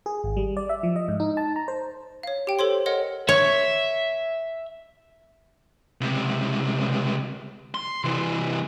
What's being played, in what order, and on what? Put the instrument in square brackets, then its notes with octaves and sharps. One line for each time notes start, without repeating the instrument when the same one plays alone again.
[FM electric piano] G#4
G#1
G3
D5
E5
F3
D#5
G#2
D#4
A5
A#5
C5
[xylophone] C#5 F5
G4 G5
A4 C5 C#5 C6
A#4 C#5 D#5 F#5
[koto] C#5 [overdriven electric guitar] E5
[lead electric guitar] C#2 C3
C6
C3 E3